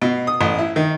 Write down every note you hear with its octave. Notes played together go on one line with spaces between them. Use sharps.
B2
D#6
A1
E4
D#3